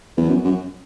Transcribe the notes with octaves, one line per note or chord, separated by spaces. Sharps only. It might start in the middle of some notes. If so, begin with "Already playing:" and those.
E2
F#2
F#2